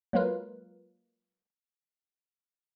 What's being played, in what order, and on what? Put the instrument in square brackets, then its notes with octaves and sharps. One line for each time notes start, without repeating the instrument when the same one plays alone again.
[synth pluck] F#3 G#3 A#3 F4 A#4 B4